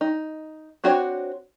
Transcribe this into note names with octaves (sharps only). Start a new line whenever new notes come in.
D#4
C4 D4 F#4 C5 C#5